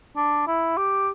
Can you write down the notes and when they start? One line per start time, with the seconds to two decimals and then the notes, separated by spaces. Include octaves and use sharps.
0.16 D4
0.47 E4
0.77 G4